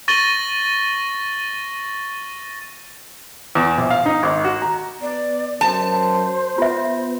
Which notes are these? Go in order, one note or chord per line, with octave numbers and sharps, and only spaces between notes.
C#6 A6 A#6 D#7 F#7 G7
E2
A#1
F5
D#4
G#1
F#4
A#5
B3 D5
F#2 C5 A5
B3 F4 E5